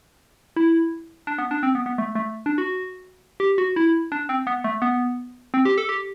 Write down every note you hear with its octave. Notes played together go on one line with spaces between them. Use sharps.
E4
D4
B3
D4
C4
B3
B3
A3
A3
D4
F#4
G4
F#4
E4
D4
C4
B3
A3
B3
C4
G4
A4
G4